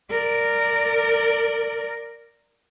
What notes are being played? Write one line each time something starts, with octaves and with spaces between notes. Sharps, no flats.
A#4 D5